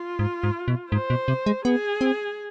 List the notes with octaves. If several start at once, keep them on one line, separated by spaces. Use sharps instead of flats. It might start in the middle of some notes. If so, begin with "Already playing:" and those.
Already playing: F4
G#2
G#2
B2
G#2 C5
B2
C3
G#3
B3 G#4
C4